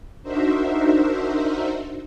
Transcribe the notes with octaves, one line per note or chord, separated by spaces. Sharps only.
D4 D#4 F#4 A#4 C5 E5